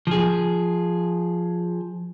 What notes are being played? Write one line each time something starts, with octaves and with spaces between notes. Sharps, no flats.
F3 G#4